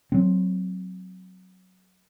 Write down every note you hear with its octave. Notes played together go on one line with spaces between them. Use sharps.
F#3 C4